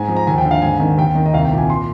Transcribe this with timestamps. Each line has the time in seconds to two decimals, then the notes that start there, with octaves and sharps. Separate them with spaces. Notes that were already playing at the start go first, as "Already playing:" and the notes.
Already playing: G#2 G#5
0.08 F3
0.16 A#5
0.27 D#2 G#5
0.38 G5
0.45 D3
0.51 F5
0.62 G#2 G#5
0.80 D#3
0.98 D#2 G5
1.15 D#3
1.26 D#5
1.33 C2 F5
1.45 G5
1.52 A#2
1.58 G#5
1.70 C6